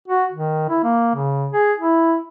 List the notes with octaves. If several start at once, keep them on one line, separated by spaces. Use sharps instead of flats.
F#4
D#3
E4
A#3
C#3
G#4
E4